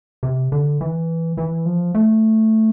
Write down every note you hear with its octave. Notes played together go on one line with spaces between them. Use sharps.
C3
D3
E3
E3
F3
A3